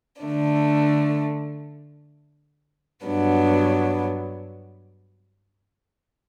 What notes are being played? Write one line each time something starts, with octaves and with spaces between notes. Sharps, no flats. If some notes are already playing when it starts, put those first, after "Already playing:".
D3 A3 D4
G2 F#3 B3 D4